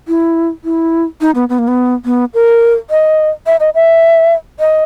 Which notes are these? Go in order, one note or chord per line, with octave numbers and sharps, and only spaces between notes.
E4
E4
D#4
B3
B3
A#3
B3
B3
A#4
D#5
E5
D#5
E5
D#5